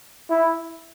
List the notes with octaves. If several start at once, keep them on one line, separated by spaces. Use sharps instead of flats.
E4